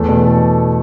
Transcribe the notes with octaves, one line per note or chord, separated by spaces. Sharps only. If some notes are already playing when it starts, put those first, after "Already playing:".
Already playing: E2 A3
B2
A4